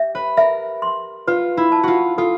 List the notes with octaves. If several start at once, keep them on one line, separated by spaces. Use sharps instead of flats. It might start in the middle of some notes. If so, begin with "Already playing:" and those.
Already playing: G4 E5
B4
A#4 E5
C6
F4 B4
E4
A5
F4 F#4
F4 A4